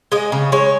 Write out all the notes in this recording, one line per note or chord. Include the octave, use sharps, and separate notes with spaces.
G#3 D#5
C#3
G#3 C#5